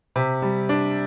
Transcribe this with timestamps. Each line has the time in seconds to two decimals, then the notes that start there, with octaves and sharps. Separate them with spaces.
0.16 C3
0.42 G3
0.69 D4